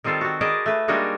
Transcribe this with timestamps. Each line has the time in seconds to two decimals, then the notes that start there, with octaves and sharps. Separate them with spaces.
0.04 D#3 G3 C4 F4 A4
0.21 C4 F#4
0.41 G#4 A#4 B4 D5 D#5 A5
0.66 A3 B4
0.88 G3 G#3 A#3 D4 D#4 F#4